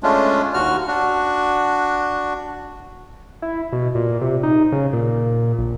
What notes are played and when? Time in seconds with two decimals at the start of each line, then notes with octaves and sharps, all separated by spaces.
0.03 G#3 A3 C#4 D4 F4
0.54 D#2 F#4 F6
0.88 D4 F#4
3.42 E4
3.72 B2
3.95 A#2
4.21 C3
4.43 D#4
4.72 C#3
4.93 A#2
5.59 A#1